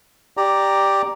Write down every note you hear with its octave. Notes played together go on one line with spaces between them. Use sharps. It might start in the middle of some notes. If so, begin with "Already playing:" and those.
G4 D5 A#5